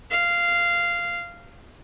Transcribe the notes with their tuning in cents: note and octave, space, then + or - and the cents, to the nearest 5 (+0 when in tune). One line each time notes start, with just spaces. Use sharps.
F5 -10